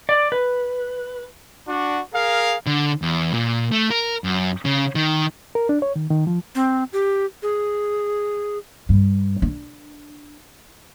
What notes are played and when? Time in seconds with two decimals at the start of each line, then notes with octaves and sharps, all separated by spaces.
0.09 D5
0.32 B4
1.68 D4 F#4
2.14 G#4 A#4 F5
2.67 D3
3.02 E2
3.34 A#2
3.72 A3
3.90 A#4
4.24 F#2
4.65 C#3
4.95 D#3
5.55 A#4
5.69 D4
5.82 C#5
5.96 D#3
6.10 D#3
6.27 F3
6.55 C4
6.93 G4
7.42 G#4
8.89 G2
9.42 D4